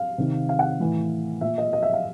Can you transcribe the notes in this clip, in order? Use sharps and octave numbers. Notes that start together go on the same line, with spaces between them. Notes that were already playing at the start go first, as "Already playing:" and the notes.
Already playing: F5
C3 D#3
F5
F#5
A2 E3
A#2 E5
D#5
D#5
E5
F5